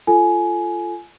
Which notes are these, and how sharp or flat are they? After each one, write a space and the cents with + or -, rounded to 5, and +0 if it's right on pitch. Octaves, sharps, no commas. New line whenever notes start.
F4 -20 A4 +0 G#5 +15